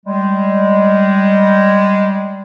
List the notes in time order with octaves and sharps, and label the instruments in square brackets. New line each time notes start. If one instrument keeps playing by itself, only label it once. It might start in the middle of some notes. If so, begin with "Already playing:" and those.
[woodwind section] G3 G#3